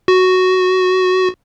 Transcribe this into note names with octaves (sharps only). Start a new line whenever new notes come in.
F#4